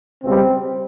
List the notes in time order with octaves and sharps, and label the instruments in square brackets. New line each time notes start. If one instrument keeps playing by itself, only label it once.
[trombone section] C#2 B2 G3 C4